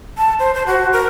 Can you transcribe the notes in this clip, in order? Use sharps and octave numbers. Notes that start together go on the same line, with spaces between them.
A5
C5
C5
F#4
A#4